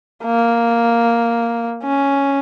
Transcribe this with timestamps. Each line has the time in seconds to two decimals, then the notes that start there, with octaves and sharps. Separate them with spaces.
0.24 A#3
1.83 C#4